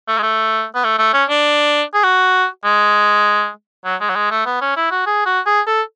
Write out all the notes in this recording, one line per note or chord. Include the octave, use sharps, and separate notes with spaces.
A3
G#3
A3
B3
A3
A3
C#4
D4
G#4
F#4
G#3
F#3
G#3
F#3
G#3
A3
B3
C#4
E4
F#4
G#4
F#4
G#4
A4